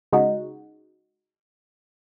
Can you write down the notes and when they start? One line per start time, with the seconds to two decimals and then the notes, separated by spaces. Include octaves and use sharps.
0.13 C#3 G#3 D#4 F#4